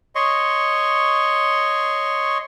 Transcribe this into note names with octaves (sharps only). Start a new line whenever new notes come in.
C#5 D#5 C6 C#6